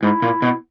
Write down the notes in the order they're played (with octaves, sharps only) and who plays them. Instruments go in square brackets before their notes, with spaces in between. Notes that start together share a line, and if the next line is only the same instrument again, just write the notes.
[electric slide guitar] G#2 [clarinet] E4
[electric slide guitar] A#2
B2